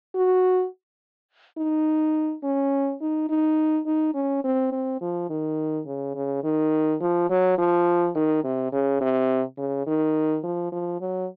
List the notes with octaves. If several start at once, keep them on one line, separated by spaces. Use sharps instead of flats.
F#4
D#4
C#4
D#4
D#4
D#4
C#4
C4
C4
F3
D#3
C#3
C#3
D#3
F3
F#3
F3
D#3
C3
C#3
C3
C#3
D#3
F3
F3
F#3